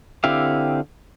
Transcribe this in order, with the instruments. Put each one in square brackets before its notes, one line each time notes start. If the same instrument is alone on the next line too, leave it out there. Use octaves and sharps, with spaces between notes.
[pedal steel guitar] D3 C4 E4 G4 F5